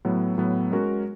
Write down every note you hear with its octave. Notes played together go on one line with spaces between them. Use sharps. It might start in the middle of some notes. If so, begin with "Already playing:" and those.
A2 F#3 B3
A2 F#3 B3
G#3 C#4 F#4 A#4